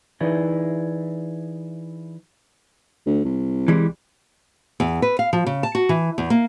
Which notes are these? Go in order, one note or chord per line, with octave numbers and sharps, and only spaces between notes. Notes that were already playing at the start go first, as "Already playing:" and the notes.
E3 D#4 E4 G#4 B4 D5
D2
C2
E3 G3 G#3
E2
B4
F5
F3
C#3
A5
F#4
E3
E2
A#3